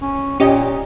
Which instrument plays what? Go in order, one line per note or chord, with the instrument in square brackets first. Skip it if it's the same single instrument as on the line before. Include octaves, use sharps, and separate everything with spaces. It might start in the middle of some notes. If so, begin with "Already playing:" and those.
[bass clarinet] C#4
[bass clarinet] A#2 [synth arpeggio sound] C#4 G4 D#5